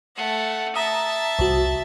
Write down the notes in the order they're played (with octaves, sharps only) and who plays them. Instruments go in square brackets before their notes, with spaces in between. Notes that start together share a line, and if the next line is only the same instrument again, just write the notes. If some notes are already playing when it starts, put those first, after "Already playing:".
[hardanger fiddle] A3 F#5
[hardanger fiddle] E5 A5 [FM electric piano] A#5 D#6
[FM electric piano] C2 F#4